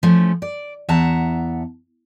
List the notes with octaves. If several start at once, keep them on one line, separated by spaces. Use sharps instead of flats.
F3 A3 C#4
D5
E2 E5 F#5 A5 A#5